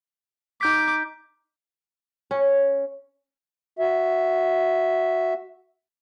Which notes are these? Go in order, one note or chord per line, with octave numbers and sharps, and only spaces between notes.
D#4 D6 G6 B6
C#4
F#4 E5